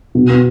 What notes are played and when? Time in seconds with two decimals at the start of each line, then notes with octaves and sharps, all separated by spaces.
0.15 B2
0.29 B3